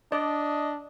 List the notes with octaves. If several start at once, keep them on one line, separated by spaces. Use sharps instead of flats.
D4 D5 D#5